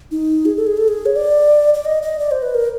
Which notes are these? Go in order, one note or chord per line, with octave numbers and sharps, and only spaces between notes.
D#4
G#4
A4
G#4
A4
G#4
C#5
D5
D5
D#5
D#5
D5
C5
B4
A#4